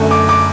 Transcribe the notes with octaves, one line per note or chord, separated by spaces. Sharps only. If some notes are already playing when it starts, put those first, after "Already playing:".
Already playing: F#2 D3 A3
D6
D6